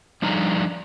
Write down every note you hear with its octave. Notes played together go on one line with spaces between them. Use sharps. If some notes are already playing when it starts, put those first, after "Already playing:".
F3 G3 D4 D#4 F5 A#5